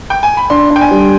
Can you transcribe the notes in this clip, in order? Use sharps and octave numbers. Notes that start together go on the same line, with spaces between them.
G5
G#5
B5
D4 C6
D4
G5
G#5
G3